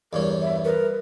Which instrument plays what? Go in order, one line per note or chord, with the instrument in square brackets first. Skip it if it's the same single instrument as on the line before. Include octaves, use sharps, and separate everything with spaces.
[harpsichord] E2 G2 C#4 [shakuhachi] A#4
[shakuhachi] E5
[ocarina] A#4 [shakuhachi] B4